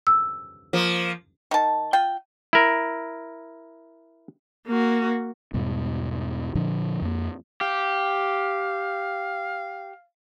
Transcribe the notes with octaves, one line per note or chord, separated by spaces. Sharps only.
E6
F3 A#3
D#3 A5
F4 G5
E4 A#4
A#3 F#4
E2 G#2 B2 G3
A#2 D3 F3 D4
F2 A#3
G4 F5